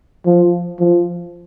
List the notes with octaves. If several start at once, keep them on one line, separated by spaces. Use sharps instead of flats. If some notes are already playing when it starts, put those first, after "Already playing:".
F3
F3